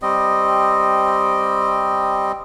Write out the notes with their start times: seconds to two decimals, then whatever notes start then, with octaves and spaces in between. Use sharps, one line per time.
0.02 G3 C4 D#5